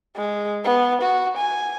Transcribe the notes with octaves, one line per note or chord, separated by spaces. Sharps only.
G#3
B3
F#4
G#5